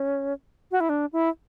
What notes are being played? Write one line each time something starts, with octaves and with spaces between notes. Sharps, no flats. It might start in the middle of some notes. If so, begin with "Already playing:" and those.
Already playing: C#4
F#4
E4
D4
E4